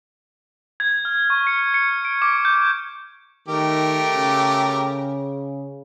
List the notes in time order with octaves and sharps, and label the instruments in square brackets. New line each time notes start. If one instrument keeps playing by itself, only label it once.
[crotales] G#6
F6
C#6
C#7
C#7
D7
D6
G6
[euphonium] D#3 [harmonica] A3 G4 A#4
[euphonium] C#3